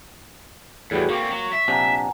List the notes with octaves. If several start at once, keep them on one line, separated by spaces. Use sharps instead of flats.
E2 A2 G3 B3 F#4 G#4
D3 A#3 C4 C#6
F#3
E5
A#1 C3 D4 F#5 G#5 A#5